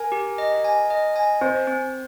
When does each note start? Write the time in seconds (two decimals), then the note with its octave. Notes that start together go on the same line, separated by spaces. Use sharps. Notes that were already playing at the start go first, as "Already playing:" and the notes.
Already playing: A#4 G#5
0.12 G4
0.38 D#5
0.64 G#5
0.90 D#5
1.16 G#5
1.41 C4 C5
1.67 C4